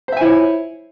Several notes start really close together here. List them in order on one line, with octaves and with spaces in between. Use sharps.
C5 E5 G#5 E4 C#5